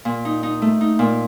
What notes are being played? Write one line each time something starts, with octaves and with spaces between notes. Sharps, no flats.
A#2
D#4
D#4
A3
D#4
A#2